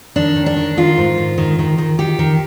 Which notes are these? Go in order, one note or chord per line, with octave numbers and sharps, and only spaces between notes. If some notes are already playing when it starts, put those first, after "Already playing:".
D#3 D4
D#3
D4
D#3
D#3 F4
G#2
D#3
D#3
D#3
D#3
D#3 G4
D#3